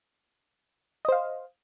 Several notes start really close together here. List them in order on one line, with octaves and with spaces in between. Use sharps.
D#5 C5 F5